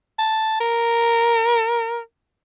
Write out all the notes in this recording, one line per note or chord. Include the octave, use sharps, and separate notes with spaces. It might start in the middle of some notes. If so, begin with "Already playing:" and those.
A5
A#4